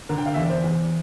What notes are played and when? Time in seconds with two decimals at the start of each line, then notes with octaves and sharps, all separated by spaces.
0.09 D3 A#4
0.18 G5
0.26 F5
0.34 E2 E5
0.41 D5
0.50 C5
0.64 E2